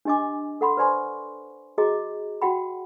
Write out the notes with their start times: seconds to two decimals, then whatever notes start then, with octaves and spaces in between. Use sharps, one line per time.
0.05 D4 G4 D#5 G#5 D6
0.61 A4 F#5 B5 C6
0.77 B4 C5 D5 G#5 C6 C#6
1.78 F#4 G#4 D#5 A#5 D6
2.42 F#4 F#5 G5 B5